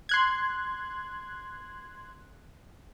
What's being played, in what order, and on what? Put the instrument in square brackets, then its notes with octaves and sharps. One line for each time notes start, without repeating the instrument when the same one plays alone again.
[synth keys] C6 F#6 G#6